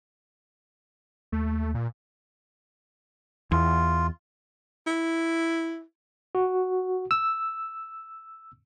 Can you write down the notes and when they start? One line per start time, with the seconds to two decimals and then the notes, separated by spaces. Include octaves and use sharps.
1.32 D#2 A3
1.74 A#2
3.52 E2 F4
4.87 E4
6.35 F#4
7.11 E6